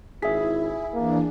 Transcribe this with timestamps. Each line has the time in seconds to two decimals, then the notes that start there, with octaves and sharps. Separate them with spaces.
0.22 G#1 E4 G#4 E5 B6
0.93 E3 A#3 D4